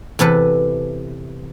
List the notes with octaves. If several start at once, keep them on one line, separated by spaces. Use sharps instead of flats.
E2 C3 A4 B4